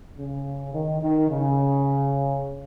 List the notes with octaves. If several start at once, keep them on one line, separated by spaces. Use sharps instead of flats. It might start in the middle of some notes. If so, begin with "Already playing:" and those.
C#3
D#3
D#3
C#3